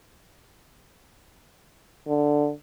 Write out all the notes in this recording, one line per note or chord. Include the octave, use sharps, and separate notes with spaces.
D3